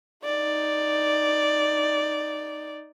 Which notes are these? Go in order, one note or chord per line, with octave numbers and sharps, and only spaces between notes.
D#4 D5